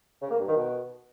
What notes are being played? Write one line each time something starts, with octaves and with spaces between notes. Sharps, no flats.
C#3
A#3
G2
D#3
B2